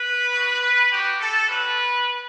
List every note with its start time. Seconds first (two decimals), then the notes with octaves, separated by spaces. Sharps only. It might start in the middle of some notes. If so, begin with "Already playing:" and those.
Already playing: B4
0.31 B3 F#4
0.61 B4
0.90 B3 F#4 G4
1.19 A4
1.48 G3 C#4 F#4 B4